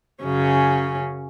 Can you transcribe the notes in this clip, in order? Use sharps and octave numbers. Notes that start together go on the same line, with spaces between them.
F#2 C#3 C#4